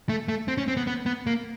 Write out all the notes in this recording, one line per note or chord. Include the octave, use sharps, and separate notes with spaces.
A3
A3
C4
C#4
C4
B3
B3
B3
A#3